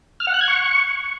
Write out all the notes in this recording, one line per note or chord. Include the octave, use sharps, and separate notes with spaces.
F6
F#5
F#6
G#6
C#6